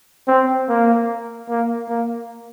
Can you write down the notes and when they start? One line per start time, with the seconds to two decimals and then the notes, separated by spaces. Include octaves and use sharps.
0.28 C4
0.69 A#3
1.49 A#3
1.89 A#3